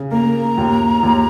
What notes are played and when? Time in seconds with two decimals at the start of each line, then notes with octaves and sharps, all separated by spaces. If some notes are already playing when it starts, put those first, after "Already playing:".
Already playing: C#3
0.11 A#3 A#5
0.58 D#2
1.03 D#2